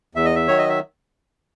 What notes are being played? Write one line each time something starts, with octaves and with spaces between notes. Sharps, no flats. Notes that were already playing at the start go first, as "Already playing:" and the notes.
E2 E5
D#5
E5
D#3 F#3 C#5
D#5
E5